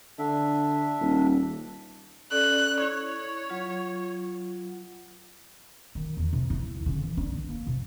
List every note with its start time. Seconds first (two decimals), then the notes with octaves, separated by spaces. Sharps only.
0.19 D3 D4 E5
1.01 D#1
2.31 C#4 A4 D5 F#6
2.81 E4 C#5
3.50 F#3 F4
5.95 D#3
6.17 E2
6.33 C3
6.50 E4
6.75 D#2
6.86 C#3
6.98 E3
7.17 D4
7.33 D#3
7.49 A#3
7.67 C3